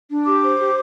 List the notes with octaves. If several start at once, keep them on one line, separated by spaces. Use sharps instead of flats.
D4
G4 D6
C5
G4